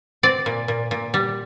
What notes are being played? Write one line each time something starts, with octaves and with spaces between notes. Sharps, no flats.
C4 D5
A#2
A#2
A#2
G3